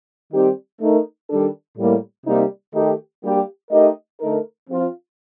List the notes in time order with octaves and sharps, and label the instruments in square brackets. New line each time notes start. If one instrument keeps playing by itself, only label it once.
[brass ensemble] D#3 G3 C4 D#4 G4
A3 D#4 A#4
D#3 G3 D4 A4
A2 G3 A#3
C3 G3 A#3 D#4
D#3 A3 D#4 G4
G3 A#3 D4 G4
A3 D#4 G4 A#4 D#5
D3 A3 D#4 A#4
F3 C4 F4